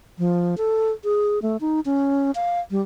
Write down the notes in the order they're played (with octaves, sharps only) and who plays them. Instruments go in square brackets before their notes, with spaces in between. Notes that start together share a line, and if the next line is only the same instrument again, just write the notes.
[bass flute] F3
A4
G#4
A3
D#4
C#4
F5
G3